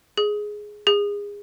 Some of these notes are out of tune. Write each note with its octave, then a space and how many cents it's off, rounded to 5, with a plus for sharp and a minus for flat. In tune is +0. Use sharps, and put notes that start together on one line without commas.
G#4 +5
G#4 -30